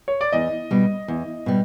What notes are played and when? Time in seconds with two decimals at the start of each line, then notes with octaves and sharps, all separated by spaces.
0.08 C#5
0.21 D5
0.32 E2 D#5
0.71 B2 G3
1.08 E2
1.46 B2 G3